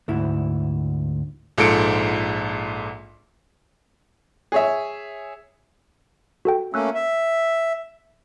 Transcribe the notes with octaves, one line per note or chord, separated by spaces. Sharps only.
D2 G#2 E4
A#1 G#2 F4 A4 C#7 D7
G#4 C#5 E5
F#4 A4 G5
A3 A#3 C#4 E6 F#6
E5